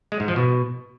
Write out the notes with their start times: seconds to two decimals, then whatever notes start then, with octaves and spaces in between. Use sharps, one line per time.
0.12 G#3
0.20 G#2
0.28 F3
0.36 B2